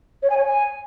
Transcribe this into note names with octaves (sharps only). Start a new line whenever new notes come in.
C#5
G#5
C#5
G#5